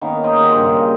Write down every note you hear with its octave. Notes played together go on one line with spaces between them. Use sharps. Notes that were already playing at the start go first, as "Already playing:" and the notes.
D#3 A#3 B3 C#4
G#4 A#4 C5 D#5
G4 A#4 D#5 F#5
G2 C#3 C5
A#2